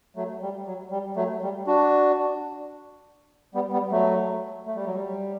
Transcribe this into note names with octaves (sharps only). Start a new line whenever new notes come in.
F#3 A3
G3
F#3
G3
F#3 A3
G3
D4 F#4
G3 B3
G3 B3
F#3 A3
A3
G3
F#3
G3